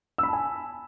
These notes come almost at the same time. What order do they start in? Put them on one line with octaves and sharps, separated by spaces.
E6 B5 A5 G#5